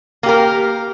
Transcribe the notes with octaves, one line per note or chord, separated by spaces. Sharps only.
A#3 G4 A#4